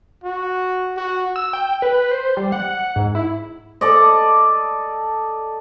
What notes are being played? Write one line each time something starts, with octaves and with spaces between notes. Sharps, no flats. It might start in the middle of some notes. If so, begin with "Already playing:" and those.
F#4
F#4
E6
G5
B4
C5
G3
F#5
G#2
E4
A4 D5 D#5